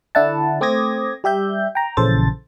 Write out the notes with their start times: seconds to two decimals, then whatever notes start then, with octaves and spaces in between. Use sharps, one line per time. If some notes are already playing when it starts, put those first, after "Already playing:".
0.15 D3 D4 E4 F#5 A5
0.61 A3 C4 D6 D#6 G#6 A#6
1.24 G3 G4 E5 G6
1.75 G5 A#5
1.97 A#1 C#3 E3 A4 C5 A6